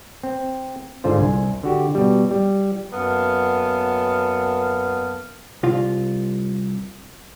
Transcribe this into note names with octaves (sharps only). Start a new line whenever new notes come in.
C4
G#2 D3 F4 C5
C2 G#5
D3 F#4 G4
B2 G3
G3
F#2 A#3 B3 A4 F5
C2 F4